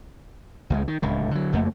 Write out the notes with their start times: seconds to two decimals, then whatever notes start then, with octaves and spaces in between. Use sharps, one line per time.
0.70 C#2 G3 G#3
0.88 D#3
1.02 D1 C#2 D3
1.31 D3 F#3
1.52 F#1 F2 A3 A#3